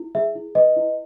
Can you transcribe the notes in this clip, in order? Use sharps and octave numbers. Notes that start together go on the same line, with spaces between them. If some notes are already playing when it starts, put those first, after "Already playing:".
Already playing: E4
G#4 E5
E4
B4 D#5
E4